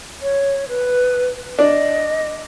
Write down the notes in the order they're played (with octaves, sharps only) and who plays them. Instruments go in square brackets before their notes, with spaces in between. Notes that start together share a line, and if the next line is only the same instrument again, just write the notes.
[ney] C#5
B4
[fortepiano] D4 [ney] D#5